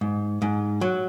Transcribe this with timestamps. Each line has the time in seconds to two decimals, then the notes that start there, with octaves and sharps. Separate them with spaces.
0.01 G#2
0.42 G#2
0.81 F#3